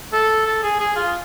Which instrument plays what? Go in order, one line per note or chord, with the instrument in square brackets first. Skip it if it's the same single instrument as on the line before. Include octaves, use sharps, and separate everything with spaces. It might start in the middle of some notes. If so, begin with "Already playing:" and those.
[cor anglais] A4
A4
G#4
G#4
F4